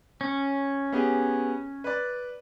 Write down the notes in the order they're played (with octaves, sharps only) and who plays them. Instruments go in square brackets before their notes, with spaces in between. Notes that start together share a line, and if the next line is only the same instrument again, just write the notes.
[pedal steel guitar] C#4
[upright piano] B3 G4 G#4
B4 D5